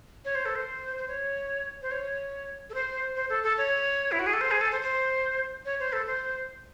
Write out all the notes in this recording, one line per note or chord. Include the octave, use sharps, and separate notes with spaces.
C#5
C5
A4
C5
C5
C#5
C5
C#5
A4
C5
C5
A4
A4
C#5
E4
F#4
G#4
A4
C5
G#4
A4
C5
C5
C#5
C5
A4
C5